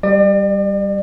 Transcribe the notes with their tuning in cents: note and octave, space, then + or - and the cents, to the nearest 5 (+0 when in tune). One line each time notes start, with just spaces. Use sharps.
G3 +0 D5 +40